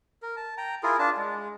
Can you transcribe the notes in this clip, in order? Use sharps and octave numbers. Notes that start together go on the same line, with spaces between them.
A#4
A5
G5 A#5
E4 F4 G#4 A#4
D4 F4 A5
G#3